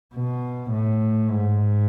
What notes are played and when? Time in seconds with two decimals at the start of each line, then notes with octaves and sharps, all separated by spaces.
0.15 B2
0.71 A2
1.30 G#2